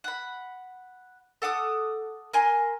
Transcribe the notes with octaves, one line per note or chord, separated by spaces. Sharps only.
F#5 B5
A4 F#5 D6 D#6
A#4 G#5 C6